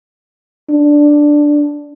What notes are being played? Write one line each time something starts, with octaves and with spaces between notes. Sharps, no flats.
D4